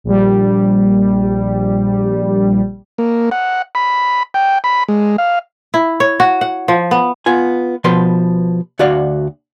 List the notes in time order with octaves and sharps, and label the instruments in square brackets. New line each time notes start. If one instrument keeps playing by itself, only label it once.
[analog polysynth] A#1 G3
[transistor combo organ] A#3
F#5
B5
G5
B5
G#3
F5
[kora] E4
C#5
F#4
F#5
F3
B3
[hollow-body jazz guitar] B3 F4 G#5
B2 F3 B4 C6
D2 F#4 D5 F5